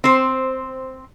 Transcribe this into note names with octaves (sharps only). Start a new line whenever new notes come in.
C4 C5